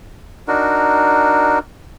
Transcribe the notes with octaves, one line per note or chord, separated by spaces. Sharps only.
D4 D#4 F#4 A#4